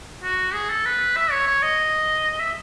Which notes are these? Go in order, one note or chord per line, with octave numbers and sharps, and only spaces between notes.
F#4
G#4
A4
B4
E5
C#5
C#5
D#5
E5